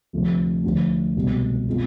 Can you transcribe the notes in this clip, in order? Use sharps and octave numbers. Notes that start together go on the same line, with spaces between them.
D2 C3 F3 A3
D2 D3 F3
C2 B2 G#3
B2 G#3 C4 F4